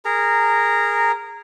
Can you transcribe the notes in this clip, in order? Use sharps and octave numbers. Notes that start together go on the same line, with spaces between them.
G#4 A#4 A#5